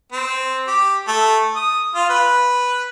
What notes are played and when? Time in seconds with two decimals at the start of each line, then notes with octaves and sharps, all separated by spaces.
0.12 C4
0.67 G4
1.07 A3
1.56 D#6
1.95 F4
2.10 B4